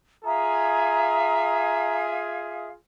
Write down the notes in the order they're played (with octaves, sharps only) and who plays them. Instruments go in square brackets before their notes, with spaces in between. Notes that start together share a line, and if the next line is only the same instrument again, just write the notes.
[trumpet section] F4 G#4 G#5 [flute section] E5 F5 D#6 [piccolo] A#5